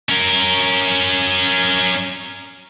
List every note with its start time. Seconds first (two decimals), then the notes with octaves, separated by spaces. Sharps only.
0.09 C#4 A#4